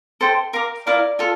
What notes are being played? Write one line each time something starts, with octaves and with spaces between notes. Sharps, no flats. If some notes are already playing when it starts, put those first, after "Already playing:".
A4 C5 G5
A#4 F5 A#5 D6
E4 A#4 D5 F5
F4 A4